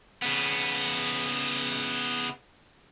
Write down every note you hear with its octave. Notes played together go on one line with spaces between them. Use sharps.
C#3 B3